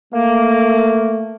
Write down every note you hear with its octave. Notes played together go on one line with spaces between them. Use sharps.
A3 A#3